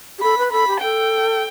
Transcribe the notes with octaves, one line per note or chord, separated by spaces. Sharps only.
G4
A4 B5
B4
A4 B5
G4
A4 G5